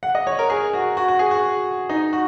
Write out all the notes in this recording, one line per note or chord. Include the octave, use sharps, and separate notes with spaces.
F#5
D#5
C#5
A#4
G#4
F#4
F#4
F#4
G#4
F#4
D#4
F#4